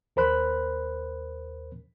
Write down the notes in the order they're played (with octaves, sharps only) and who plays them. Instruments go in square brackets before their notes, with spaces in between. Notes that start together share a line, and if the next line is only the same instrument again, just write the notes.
[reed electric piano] D#2 A#4 C5 B5 F#6